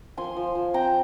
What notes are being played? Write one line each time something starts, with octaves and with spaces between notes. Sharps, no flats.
F3 G#5 C6
F3
F3
C4 G5 A#5